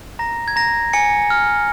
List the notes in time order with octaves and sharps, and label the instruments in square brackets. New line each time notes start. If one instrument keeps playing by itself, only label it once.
[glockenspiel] A#5 A#6
G#6
A#5 A#6
G#5 C#7
F6